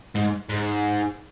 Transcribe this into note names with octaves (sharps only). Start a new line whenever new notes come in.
G#2
G#2